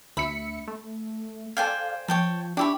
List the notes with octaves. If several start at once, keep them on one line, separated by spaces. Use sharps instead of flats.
D2 E5 B5 C#7
A3
A4 C5 D5 F5 G5 G#5
F3 C#5 G5 A5
D4 E4 G4 B5 C#6